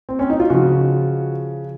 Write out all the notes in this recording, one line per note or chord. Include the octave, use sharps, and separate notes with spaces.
C4
C#4
D#4
F4
C#3 F3 F#4